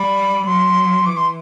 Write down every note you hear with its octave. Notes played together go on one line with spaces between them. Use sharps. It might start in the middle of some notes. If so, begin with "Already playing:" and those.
Already playing: G3 B5
F#3 C6
E3 D6
C6